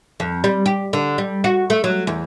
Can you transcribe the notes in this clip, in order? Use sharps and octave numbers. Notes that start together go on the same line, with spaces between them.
F2
G3
G4
D3
G3
F#4
A3
F#3
E2